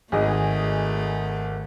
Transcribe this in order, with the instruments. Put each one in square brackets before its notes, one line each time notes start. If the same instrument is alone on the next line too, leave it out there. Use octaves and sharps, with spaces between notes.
[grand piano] G#1 [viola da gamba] A3 [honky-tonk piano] G#4 D#5